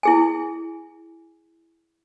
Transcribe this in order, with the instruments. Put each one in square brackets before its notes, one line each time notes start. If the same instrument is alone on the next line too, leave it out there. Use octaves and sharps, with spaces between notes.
[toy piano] E4 G#4 G#5